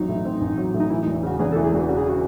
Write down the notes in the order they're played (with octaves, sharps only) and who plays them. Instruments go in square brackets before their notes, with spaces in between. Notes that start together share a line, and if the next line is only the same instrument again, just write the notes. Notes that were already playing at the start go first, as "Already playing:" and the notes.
Already playing: [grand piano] A1 F#3 C4 [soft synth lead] D#4
[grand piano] A2
C4
A1
F#3
A2
[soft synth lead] D#4
[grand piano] E3 [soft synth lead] E4
[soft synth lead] D#4
[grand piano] E1
[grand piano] C#3 [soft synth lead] F#4
[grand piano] E2 [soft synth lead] G#4
[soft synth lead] A4
[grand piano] E3
[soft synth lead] G#4
[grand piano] E1 [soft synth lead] F#4
[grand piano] C#3 [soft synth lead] F#4
[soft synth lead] G#4
F#4